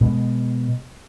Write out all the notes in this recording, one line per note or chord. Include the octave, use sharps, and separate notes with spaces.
B2 G#3